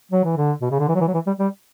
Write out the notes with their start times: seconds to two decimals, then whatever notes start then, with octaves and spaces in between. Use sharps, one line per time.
0.12 F#3
0.24 E3
0.37 D3
0.61 B2
0.71 C#3
0.79 D3
0.89 E3
0.95 F#3
1.01 E3
1.08 F#3
1.14 E3
1.27 G3
1.39 G3